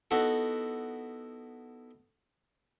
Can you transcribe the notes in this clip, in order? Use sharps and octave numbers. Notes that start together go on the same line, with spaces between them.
B3 D#4 E4 F#4 A4